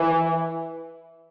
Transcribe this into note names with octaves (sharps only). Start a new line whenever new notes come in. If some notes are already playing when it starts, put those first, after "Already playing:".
Already playing: E3